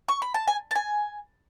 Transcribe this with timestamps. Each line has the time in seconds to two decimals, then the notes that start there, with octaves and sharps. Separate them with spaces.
0.08 C#6
0.22 B5
0.34 A5
0.48 G#5
0.71 A5
0.75 G#5